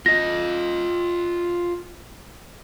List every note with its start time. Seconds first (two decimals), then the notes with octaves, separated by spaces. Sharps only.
0.06 F4 D#5 A#6